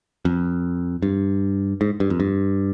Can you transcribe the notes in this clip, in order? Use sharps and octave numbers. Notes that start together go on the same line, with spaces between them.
F2
G2
G#2
G2
F2
G2